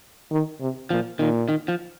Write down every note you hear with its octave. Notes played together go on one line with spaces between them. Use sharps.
D#3
C3
A#2 F3
A#2 D#3
D#3
F3